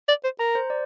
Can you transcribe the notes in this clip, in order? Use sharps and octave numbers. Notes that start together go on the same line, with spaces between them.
D5
C5
A#4 A#5
C5
D5